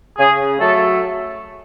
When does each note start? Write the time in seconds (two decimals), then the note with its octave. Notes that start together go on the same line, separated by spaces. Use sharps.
0.18 C#3 G#4
0.59 F#3 A3 A4